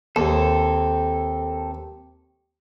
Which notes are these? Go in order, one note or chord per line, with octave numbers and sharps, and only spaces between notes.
D#2 C4 A4